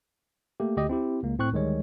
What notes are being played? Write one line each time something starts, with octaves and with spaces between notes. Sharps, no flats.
A3 A#3 G4
D2 G4 D#5
C4 E4 G4
C#2 A#3
A2 C4 C#6 F#6
D2 D#3 G3 G#3 C#5